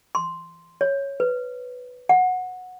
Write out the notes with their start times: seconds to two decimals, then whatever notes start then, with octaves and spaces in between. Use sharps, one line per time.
0.15 C6
0.81 C#5
1.20 B4
2.09 F#5